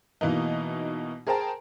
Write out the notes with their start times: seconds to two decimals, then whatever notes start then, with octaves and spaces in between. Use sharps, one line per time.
0.21 B2 E3 A#3 D#4
1.27 G#4 A#4 C5 G5 A5 A#5